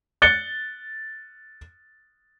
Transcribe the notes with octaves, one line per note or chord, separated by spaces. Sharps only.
F#6 A6 C#7 G7